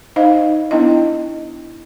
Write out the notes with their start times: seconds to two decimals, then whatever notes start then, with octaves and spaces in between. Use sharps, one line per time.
0.16 D#4 C5 D#5 F5
0.71 B3 D4 E4 D#5